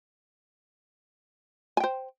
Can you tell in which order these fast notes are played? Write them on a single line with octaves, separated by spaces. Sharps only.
G#5 G5 C5